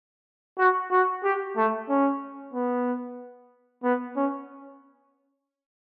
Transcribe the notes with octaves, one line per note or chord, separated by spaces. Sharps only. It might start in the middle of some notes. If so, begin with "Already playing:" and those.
F#4
F#4
G4
A3
C#4
B3
B3
C#4